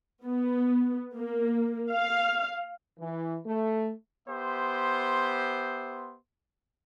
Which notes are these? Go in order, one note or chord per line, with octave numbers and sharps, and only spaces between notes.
B3
A#3
F5
E3
A3
B3 G4 C5 E5 C6